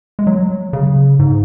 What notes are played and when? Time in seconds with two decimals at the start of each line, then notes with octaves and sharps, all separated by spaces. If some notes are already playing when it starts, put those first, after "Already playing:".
0.19 G#3
0.27 F#3
0.73 C#3
1.19 G#2